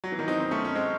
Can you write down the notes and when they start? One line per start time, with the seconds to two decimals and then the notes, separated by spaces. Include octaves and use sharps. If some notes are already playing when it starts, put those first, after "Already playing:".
0.04 F#3
0.12 E3
0.19 D#3 F#3
0.28 C4 D#4
0.40 C4
0.51 A3 C#4
0.65 C#4
0.75 G#3 C4